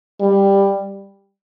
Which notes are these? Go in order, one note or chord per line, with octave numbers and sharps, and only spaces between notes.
G3